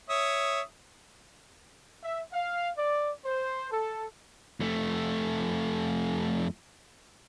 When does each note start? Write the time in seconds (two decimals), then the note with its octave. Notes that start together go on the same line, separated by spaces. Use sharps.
0.09 C#5 E5 D#6
2.03 E5
2.33 F5
2.78 D5
3.25 C5
3.71 A4
4.60 F2 A3